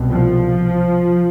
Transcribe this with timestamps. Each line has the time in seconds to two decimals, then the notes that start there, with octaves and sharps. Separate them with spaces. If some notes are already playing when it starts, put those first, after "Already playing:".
Already playing: C2 B2
0.09 F3